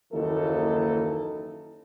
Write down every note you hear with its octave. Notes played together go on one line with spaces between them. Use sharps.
F#1 D#2 E3 D#4 A4